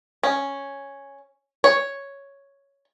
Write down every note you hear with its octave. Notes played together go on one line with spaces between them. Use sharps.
C#4
C#5